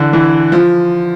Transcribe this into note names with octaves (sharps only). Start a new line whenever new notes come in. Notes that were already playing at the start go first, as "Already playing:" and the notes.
Already playing: D3 E3
E3
F3